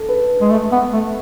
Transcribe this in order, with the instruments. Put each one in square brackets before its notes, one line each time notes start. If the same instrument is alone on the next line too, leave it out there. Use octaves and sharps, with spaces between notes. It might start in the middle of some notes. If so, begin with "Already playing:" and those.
Already playing: [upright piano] A4
B4
[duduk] G#3
A3
B3
A3